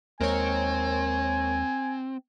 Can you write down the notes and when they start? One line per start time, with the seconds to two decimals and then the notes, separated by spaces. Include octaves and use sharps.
0.21 D#2 G#3 C4 A#4 C#5 G#5